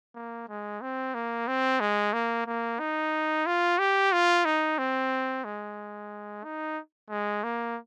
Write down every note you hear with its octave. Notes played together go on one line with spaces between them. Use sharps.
A#3
G#3
C4
A#3
C4
G#3
A#3
A#3
D#4
F4
G4
F4
D#4
C4
G#3
D#4
G#3
A#3